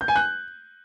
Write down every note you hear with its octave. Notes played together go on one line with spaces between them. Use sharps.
G6
G#5
F#6